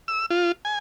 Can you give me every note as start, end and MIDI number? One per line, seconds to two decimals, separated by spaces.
0.08 0.26 88
0.30 0.52 65
0.65 0.79 80